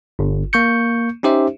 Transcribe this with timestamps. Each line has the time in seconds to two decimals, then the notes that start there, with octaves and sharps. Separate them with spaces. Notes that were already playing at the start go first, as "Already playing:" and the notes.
0.19 G1
0.53 A#3 C#6 G6 C#7
1.23 C#4 D#4 G4 C5 E5